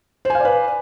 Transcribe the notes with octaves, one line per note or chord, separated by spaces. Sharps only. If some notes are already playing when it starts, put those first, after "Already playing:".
B4 C5 D5 F5 G#5